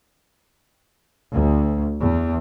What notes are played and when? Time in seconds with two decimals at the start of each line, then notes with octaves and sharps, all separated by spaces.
1.33 D2
2.00 E2